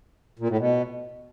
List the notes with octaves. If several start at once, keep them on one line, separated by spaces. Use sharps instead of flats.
A#2
A2
B2